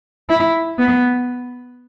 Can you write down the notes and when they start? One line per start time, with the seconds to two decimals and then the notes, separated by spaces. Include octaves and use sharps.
0.29 E4
0.79 B3